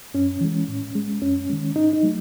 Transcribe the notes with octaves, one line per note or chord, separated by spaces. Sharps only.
F#2 C#4
E3 G#3
A2
G#3
F#2 C#4
D#3 G#3
G#2 D#4
D#4
F#3 A3